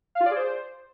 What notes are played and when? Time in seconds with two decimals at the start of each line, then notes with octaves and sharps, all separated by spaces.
0.15 F5
0.20 F4
0.26 D5
0.31 G#4
0.36 C5